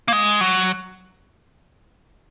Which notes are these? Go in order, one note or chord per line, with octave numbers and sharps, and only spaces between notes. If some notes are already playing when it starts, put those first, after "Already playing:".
A#3
G#3
F#3